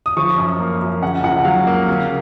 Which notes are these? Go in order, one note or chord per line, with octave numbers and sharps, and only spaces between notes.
D#6
F3 C#6
F#2
A#3
F#2
C#3 F#5
C#2 F#5
F#3 F5
A#3
C#3